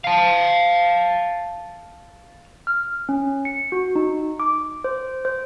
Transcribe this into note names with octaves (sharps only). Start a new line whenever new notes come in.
F5 A5
F6
C#4
C#7
F#4
D#4
D6
C5
C5